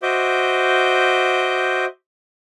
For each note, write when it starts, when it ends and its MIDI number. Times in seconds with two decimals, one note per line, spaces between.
0.03 1.85 66
0.03 1.85 72
0.03 1.85 75
0.03 1.85 76
0.03 1.85 86
0.03 1.85 91